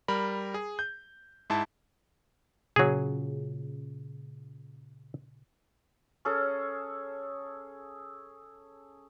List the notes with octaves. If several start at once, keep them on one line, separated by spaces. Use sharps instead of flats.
G3 A#4 B5
G#4
G6
G#2 E4 A5
A#2 C#3 F#3 G#4
C#4 G#4 A4